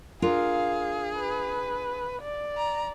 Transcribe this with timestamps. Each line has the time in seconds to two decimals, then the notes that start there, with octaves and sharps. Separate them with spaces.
0.22 D4 F4 G#4 A#4 F5
1.17 B4
2.22 D5
2.57 A#5